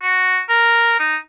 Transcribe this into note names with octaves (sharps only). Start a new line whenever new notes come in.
F#4
A#4
D#4